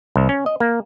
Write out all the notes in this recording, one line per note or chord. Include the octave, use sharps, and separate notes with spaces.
C2
C#4
D#5
A#3